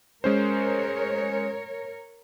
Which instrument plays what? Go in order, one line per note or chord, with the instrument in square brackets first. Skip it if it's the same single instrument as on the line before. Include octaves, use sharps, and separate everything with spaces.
[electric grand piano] G#3 C#4 C5 [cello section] A#4 C#5